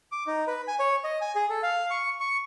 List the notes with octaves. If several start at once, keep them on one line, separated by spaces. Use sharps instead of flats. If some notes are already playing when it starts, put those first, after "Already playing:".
D6
D#4
B4
G#5
C#5
D#5
G#5
G#4
A4
F5
C#6
C#6